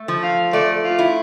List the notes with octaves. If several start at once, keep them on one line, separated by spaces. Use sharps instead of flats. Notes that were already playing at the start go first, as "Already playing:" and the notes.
Already playing: A3
F3
F5
A3 D5
F4
E4